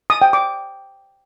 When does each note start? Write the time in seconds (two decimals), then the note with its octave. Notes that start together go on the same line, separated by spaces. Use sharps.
0.10 D#6
0.22 G5
0.33 D6